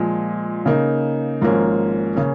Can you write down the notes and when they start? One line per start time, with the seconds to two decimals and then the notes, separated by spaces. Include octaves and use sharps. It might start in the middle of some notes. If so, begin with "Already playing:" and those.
Already playing: A#2 F3 G#3
0.66 C#3 A#3 D#4
1.41 G#1 G#2 F3 A#3 C#4
2.16 C#3 A#3 C#4